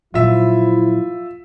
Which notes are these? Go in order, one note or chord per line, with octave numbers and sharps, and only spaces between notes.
A#2 F3 F#3 E4 F4 E5